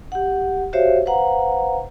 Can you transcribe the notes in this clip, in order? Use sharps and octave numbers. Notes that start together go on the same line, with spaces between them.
G4 F#5
F#4 G4 C5 C#5 E5 F5
B4 C5 F5 F#5 A#5